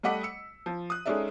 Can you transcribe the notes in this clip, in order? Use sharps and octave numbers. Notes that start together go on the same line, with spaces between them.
G3 A3 D#5 F#5 D6 B6
E6 C#7
F3
D#6 F#6
G#3 C#4 D#4 A4 D5 E5